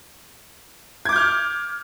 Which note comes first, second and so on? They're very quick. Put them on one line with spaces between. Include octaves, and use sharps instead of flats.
G#6 D6 G6 F6